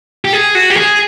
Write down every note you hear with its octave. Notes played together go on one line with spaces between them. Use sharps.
G4
G#4
F#4
G4
G#4